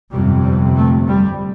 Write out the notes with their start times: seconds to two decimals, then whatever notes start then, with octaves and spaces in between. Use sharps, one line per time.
0.11 G1 F2 C3 G3
0.44 G3
0.76 A3
1.08 G3